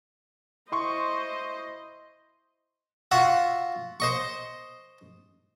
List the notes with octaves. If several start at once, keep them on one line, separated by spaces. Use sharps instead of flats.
E4 C5 D#5 C6 C#6
F4 F#4 E5 F#5
C5 D#5 C#6